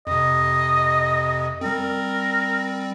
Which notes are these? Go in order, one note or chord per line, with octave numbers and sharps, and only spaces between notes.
F2 C3 D#5
G3 C4 A#4